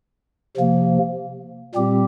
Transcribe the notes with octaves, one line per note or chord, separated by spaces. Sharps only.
C3 F3 A#3
A#2 G3 C4 G4